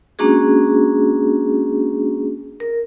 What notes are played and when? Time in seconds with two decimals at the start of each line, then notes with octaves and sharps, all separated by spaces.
0.19 G#3 A#3 C#4 D4 F#4 G#4
2.60 A#4